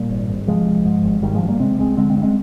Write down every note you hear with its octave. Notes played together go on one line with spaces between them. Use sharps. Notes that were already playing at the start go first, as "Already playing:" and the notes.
Already playing: A#2 G3 A#3
G#1
G#1
C3 F3 G#3
C2
G#2
G#1
G#1 D#3 G3
F3 G#3
G2
G3 A#3
C3 G#3 C4
C2 G#3 C4
D3 G#3 C4
G#3 C4
G2
G#3 C4